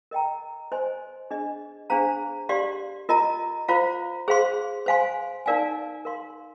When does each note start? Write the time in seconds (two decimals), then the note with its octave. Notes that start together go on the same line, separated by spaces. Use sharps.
0.11 A#4 D#5 G5 A#5
0.72 C5 D#5 G#5 C6
1.30 D4 G#4 D#5
1.90 D4 G#4 C5 F5 A#5
2.49 G4 D5 F5 C6
3.09 F4 A#4 D#5 A#5
3.68 F4 C5 F5 A#5
4.28 G#4 C5 F5 C6
4.86 C5 F5 G#5 C6
5.46 D#4 A#4 D5 F5 G#5
6.05 A#4 F5 C6